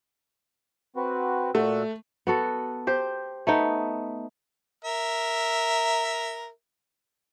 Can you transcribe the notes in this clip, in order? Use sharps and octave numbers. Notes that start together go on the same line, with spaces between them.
C4 F#4 B4
A#2 A3 F#4 E6
B3 F#4 A4
G4 C5
A3 B3 D#4
A#4 E5